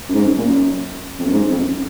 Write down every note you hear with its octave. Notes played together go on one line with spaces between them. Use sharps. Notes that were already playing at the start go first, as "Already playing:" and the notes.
F#2
G#2
F#2
A#2
F#2
F2
F#2
G#2
F2
F#2